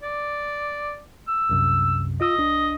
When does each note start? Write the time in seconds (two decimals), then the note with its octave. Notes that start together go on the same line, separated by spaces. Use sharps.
0.03 D5
1.28 E6
1.50 C2 F#2 C3
2.21 F4 D#5 E6
2.39 C2 D4